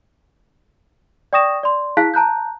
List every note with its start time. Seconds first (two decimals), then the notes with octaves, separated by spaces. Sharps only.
1.33 D5 G5 C#6 D#6 A#6 E7
1.63 D5 C6
1.97 E4 G#4 F5 A5 F#6 B6
2.14 A5 A#5 F#6 G6